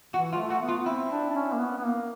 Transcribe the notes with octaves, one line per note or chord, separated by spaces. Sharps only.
E3 F#4
F4
A3
F#4
B3
F4
C4 E4
D4
D4
C#4
A#3
B3
B3
A#3